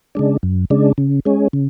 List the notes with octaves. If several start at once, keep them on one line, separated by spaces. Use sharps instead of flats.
C#3 G#3 D4
F#2
C#3 G#3 D4
C#3
G#3 C#4
C#3